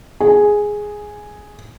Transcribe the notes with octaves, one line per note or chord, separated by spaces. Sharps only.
G#4